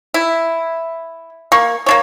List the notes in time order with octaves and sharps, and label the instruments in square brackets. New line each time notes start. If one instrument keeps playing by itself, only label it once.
[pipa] E4
A#3 C#6
A#3 D4 C#5